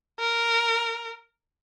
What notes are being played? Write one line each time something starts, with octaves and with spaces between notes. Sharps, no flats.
A#4